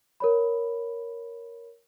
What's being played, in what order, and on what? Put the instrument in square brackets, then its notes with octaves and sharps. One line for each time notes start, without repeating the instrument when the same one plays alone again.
[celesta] A#4 C#5 B5